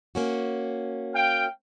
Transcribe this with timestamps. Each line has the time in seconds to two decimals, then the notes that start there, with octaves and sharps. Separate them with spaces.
0.15 A#3 C#4 F#4
1.15 F5 G5